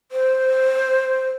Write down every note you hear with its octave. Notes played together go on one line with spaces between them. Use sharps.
C5